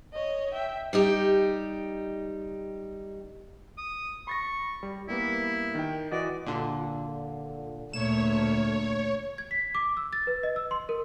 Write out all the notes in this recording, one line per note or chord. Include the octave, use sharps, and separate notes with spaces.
C#5 D#5
E5 G5
G3 D#4 G4
D#6
B5 C#6 A6 A#6
G3
G3 A#3 B3 E4
D#3 G5
E3 F#4 D5 D#5
A#2 D3
D2 A#2 A3 C#5 E7
G#6
B6
D6
E6
A6
B4
D#5
E6
C6
A#4